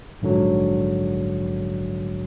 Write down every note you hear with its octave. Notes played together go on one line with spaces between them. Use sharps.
A#1 G#2 D3 F#3